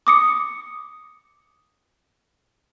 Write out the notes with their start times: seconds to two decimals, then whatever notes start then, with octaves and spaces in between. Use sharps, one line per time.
0.07 D6 D#6 C#7